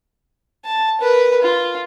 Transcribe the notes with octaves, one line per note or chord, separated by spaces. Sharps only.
A5
A#4 B4
F4